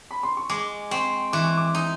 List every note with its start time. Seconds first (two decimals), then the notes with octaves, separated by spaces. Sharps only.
0.11 B5
0.23 C6
0.37 C#6
0.49 G#3 D6
0.91 C4 C#6
1.33 E3 D6
1.45 C#6
1.57 D6
1.74 D#4 D#6